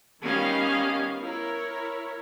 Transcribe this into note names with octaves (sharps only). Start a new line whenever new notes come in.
D#3 G3 B3 C#4 D#5 F5
E4 A#4 C#5